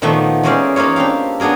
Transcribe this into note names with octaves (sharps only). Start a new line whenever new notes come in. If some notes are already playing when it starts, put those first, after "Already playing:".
A#2 D#3 F3 A3 B3 E5
E3 G#3 C#4 A#4 C5 D5
A#3 D#4 F4 C#5
C4 D4 G4 F5
F#3 B3 D4 G#4 A#4